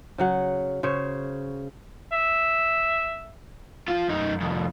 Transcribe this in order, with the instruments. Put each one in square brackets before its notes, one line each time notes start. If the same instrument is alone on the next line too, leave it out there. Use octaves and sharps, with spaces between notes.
[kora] C#3 F#3 F#5
C#3 C5 C#5
[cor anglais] E5
[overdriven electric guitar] F3 F4
F#2 D#4
C2 F2